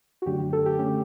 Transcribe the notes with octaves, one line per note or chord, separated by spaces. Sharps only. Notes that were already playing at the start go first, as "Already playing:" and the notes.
F#4
F#2 D3 F#3 A3 D4 G4
G4
A4
G4
D3 A3 C#4 G4